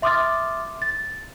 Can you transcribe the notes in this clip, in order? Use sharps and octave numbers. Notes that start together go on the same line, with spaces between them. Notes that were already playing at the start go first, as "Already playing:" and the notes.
E5 C6 D6 D#6 F6 A6
A6